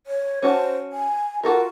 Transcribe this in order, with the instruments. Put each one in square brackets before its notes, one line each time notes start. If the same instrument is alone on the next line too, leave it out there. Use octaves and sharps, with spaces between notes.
[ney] C#5
[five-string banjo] C#4 F#4 A5 [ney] C5
[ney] G#5
[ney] F4 [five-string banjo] F#4 A4 A#4